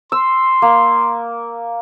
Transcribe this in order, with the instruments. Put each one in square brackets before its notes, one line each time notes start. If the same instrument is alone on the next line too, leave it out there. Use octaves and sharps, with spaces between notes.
[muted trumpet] C6 [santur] E6
[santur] A#3